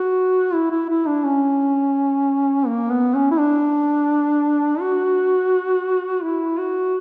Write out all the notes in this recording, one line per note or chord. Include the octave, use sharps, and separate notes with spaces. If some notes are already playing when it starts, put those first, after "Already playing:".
Already playing: F#4
E4
E4
E4
D4
C#4
A#3
B3
C#4
E4
D4
F#4
E4
F#4